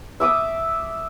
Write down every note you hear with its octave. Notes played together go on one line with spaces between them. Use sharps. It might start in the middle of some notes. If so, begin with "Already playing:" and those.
E5 D6 D#6